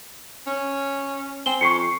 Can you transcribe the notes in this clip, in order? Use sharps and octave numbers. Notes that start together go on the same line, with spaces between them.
C#4
C4 G#5 G7
F2 C#6 C7 C#7